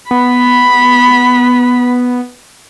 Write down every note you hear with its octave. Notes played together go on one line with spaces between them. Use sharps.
B3 B5